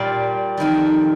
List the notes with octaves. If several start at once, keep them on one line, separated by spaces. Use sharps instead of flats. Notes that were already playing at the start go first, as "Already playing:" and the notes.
Already playing: A#2 G3 D5 F5 G5
F2 D#3 G3